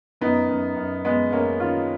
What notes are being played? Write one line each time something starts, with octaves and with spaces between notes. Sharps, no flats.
F#2 B3 D#4
F#2
F#2
F#2 G#3 B3
F#2 A#3 C#4
D#3 C#4 F4